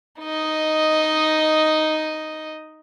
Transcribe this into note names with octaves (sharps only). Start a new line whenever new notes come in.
D#4 D#5